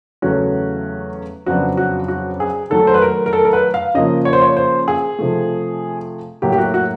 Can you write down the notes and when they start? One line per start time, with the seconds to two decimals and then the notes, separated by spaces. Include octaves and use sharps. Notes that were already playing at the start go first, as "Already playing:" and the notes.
0.22 E2 C#3 F#3 A3 C#4 F#4
1.46 F2 C#3 F#3 B3 D4 F#4
1.77 F#4
2.08 F#4
2.40 G#4
2.70 D#3 F#3 A3 A4
2.87 C5
2.94 B4
3.02 A#4
3.26 A#4
3.33 A4
3.45 A#4
3.53 B4
3.74 F5
3.94 C#3 F3 A#3 D#5
4.25 C#5
4.33 C5
4.42 C#5
4.57 C5
4.88 G#4
5.19 C3 F3 A3
6.42 A2 F#3 A#3 G4
6.52 G4
6.58 F#4
6.74 F#4